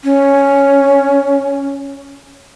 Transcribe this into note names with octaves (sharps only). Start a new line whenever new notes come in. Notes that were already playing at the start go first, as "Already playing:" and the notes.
C#4